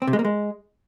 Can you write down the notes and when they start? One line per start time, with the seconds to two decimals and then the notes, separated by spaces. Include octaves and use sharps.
0.02 C4
0.07 C3
0.13 G#3
0.19 A#3
0.25 G#3